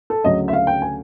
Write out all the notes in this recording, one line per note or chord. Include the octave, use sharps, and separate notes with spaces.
A4
D2 C#3 F#3 D#5
E5
F5
G5
G#5